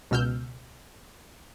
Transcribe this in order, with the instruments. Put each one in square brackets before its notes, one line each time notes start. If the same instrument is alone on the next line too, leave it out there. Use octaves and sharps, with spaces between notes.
[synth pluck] C#2 B2 E6 F6 G6